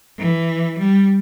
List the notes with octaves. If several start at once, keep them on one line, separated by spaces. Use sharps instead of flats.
E3
G3